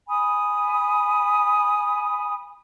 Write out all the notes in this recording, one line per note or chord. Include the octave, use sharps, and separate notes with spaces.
G#5 B5 D#6